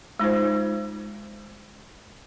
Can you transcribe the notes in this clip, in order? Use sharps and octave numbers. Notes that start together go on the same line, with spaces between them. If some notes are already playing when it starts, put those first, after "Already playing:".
G#3 D#4 F4 C5